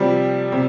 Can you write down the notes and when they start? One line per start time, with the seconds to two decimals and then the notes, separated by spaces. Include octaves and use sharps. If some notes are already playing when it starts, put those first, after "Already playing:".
Already playing: C3 F3 G3
0.52 C3